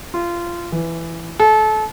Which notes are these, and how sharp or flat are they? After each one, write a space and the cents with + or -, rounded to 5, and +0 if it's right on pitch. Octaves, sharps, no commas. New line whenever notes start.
F4 -20
E3 +10
A4 -30